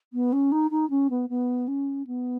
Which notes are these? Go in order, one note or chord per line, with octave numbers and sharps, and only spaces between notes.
B3
C#4
D#4
D#4
C#4
B3
B3
C#4
B3